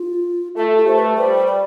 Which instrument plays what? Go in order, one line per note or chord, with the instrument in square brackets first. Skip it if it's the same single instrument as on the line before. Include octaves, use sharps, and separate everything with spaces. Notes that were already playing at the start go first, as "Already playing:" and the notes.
Already playing: [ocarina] F4
[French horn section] A3 [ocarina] F4
[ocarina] G4
[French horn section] A3 [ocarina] C5
[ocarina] B4
[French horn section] G3 [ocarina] C5
[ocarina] D5